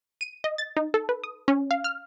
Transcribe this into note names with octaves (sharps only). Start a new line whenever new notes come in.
D#7
D#5
A6
D#4
A4
B4
D#6
C#4
F5
F6